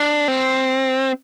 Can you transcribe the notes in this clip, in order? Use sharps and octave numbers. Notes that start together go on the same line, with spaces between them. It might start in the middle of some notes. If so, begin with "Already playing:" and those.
Already playing: D4
C4